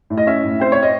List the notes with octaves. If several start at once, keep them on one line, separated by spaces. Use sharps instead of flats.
A2
D#5
C#4 E5
A2
C4 C5
C#5
D#5